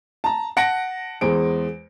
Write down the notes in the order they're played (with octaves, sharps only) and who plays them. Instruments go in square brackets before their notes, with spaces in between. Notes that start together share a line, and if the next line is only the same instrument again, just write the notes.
[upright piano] A5 A#5
F#5 A5 A#6 C#7 D7
E2 G#3 C5 D7